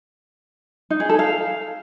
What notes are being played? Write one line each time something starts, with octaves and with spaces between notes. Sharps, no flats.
D#4
G#4
A4
F5